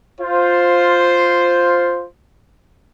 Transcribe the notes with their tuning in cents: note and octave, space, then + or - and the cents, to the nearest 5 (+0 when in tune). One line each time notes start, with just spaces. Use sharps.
F4 +5 C5 +0